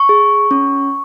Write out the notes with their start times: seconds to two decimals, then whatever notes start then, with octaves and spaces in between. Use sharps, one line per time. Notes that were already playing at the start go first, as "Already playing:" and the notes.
Already playing: C#6
0.09 G#4
0.51 C#4